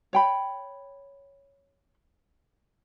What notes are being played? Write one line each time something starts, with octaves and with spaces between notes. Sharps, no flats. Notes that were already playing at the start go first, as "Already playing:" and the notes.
C#5 G5 B5